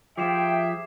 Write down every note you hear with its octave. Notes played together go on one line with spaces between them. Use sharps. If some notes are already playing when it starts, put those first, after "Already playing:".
F3 G4 G#4 E5 G5 D6 C7 E7